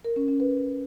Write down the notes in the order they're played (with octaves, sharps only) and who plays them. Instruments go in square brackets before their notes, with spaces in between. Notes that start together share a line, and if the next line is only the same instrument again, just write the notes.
[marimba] A#4
C#4
C#4
B4